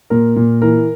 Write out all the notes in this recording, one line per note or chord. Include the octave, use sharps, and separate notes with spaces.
A#2 A#4
A#2
E3 A#4